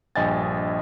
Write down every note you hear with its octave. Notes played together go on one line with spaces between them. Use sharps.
A#1 G2 D#5 G5 G#5 A6